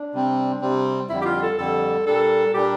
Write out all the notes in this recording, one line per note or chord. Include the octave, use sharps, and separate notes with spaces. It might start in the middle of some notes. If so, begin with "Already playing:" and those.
Already playing: D4
C3 G3 C4
C3 G3 C4
F2 D3 G3 E4
G4
F4
A4
F2 D3 G3 A4
A#2 G3 D4 A4
A#2 G3 D4 G4